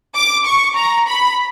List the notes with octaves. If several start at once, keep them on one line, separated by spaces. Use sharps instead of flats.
D6
C#6
A#5
B5